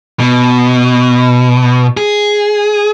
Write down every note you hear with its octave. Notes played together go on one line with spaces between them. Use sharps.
B2
G#4